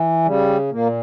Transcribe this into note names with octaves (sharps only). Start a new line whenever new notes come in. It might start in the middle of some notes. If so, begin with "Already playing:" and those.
Already playing: E3
C#3 G3
A#2 A#3